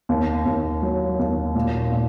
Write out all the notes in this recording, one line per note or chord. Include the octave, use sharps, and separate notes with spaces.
D#2
D#2
F#3
D#2
A#2
A#2